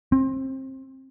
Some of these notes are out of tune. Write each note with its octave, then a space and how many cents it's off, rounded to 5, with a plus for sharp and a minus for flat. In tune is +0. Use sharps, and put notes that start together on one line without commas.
C4 +25